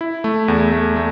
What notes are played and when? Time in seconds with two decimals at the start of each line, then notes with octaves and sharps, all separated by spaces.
0.01 E4
0.24 A3
0.48 E2
0.72 A3
0.96 A3